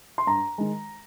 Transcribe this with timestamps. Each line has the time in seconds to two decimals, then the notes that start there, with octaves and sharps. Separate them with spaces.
0.18 C6
0.27 G2 A#5
0.58 D#3 G#3